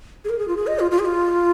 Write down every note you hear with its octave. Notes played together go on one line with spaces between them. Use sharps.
G#4
A#4
G#4
F4
G#4
D#5
F4
F4
G#4
F4